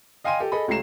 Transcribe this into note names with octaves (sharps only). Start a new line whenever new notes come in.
D#5 F5 G5 G#5 C6 D#7
G4 A4
G#4 A4 D#5 B5
C#2 A3 G4 A#5 C7 E7